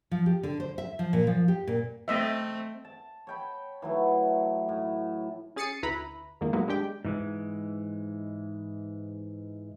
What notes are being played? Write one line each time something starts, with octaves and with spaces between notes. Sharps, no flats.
F3
G4
D3
C5
E5
F3
A#2
F3
G4
A#2
A3 C4 D#5 E5
A5
C#5 G5 B5
E3 F#3 A3
A2
C#4 G#4 A6 C7 C#7 D#7
D2 E4 B4 A#5 B5
F2 G#2 D#3 A#3
A1 A2 F#3 G#3 A#3 B3
G#3 D4 G4 G5
G#2 E3 G#3